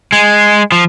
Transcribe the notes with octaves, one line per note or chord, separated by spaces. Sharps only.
G#3
F3